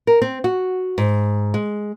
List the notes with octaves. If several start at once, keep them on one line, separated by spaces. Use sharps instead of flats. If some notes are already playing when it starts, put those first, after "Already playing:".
A#4
C4
F#4
G#2
G#3